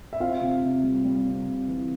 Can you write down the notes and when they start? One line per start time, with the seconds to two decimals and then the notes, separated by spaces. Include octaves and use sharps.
0.13 E5
0.20 C4 F4 F5
0.41 C3
0.63 C3
0.83 G3
1.04 G3
1.26 C3
1.47 C3
1.68 E3